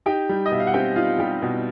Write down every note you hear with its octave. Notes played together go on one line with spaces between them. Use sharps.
D#4 G4 G5
G3
D#5
B2 E5
F5
F#5
C4 G4 G5
D#4 F4 F5
G3 G4 G5
B2